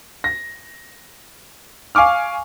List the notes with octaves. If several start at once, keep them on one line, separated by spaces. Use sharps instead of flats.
A#6
F5 G#5 C#6 D6 F6